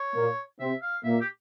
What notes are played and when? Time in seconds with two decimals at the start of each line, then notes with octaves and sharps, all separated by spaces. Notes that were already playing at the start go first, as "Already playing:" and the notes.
Already playing: C#5
0.15 A#2 A#3
0.59 C3 C4 E5
0.82 F5
1.04 A#2 A#3 E5
1.21 G4